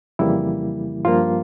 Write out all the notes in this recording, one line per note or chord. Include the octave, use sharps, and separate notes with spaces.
F2 C#3 E3 G3 A#3 E4
G2 F3 A#3 F4